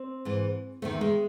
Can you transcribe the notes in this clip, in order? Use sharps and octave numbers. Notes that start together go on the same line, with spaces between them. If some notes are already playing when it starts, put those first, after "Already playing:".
Already playing: C4
G#2 E3
E2 C3 D#3 A3
G#3